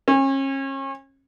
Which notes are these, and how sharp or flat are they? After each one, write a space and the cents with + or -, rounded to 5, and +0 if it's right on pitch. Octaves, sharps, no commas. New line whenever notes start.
C#4 -35